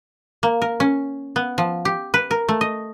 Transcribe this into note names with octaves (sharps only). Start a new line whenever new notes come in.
A#3
A#4
C#4
B3
F3
G4
B4
A#4
A3
D#5